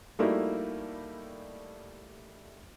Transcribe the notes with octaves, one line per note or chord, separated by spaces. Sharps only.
G3 A3 A#3 D#4 E4 F#4